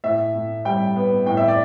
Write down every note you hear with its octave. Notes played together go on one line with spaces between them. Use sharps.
A2 E5
A2
G3 G5
B3
A2 G5
E5
D5